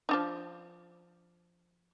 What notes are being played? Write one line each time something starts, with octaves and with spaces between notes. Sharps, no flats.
F3 D4 D#4